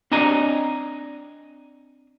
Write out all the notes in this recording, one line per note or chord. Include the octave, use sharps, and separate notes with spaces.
C4 D4 D#5 G#5 A#5